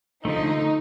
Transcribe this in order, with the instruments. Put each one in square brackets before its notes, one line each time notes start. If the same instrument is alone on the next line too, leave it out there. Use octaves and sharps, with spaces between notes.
[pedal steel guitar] D3 F3 A3 [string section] D#4